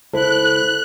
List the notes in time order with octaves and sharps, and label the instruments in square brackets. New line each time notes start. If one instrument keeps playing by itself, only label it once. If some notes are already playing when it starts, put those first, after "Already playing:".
[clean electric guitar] C#2 E4 [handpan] A4 [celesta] C5 [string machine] F#6